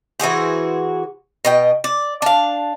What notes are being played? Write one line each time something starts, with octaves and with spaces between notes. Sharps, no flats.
E3 F#4 G#4 C5
B2 D#5 G5
D5
D4 F5